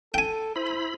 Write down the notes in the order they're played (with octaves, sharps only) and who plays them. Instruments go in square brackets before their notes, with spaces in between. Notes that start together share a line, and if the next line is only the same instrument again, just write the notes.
[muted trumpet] A4 [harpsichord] G5 G#5
[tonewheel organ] E4 B5 [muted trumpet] C5